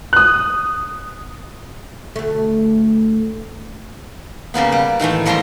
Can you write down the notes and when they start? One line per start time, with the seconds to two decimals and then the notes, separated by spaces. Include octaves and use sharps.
0.13 D#6 F#6
2.16 D2 A3
4.54 C#3 G3 A#3 B3
4.72 G3
5.00 A2 D#3 E3 A3
5.26 F2 F3 G3 A3 A#5 C6